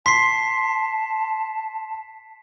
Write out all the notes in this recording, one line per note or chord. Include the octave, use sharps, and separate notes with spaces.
A5 C6 B6 C7